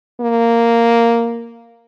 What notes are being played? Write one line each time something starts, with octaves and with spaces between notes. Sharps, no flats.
A#3